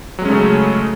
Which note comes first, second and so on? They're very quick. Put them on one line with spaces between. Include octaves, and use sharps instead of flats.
F#3 G#3 C#4 A3 C#3